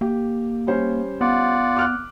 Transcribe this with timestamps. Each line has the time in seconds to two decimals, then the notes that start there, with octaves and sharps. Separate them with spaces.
0.01 A#3 G4
0.67 G3 C#4 C5
1.21 B3 F4 D5 F#5
1.77 D6 F6 F#6